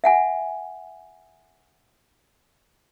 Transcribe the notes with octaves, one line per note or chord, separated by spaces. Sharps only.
E5 F#5 G#5